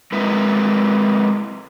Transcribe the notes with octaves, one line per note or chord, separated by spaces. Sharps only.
G#3 C4 E4 A#4 B4